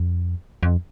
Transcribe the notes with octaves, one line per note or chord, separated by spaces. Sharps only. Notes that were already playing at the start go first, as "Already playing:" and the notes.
Already playing: F2
F2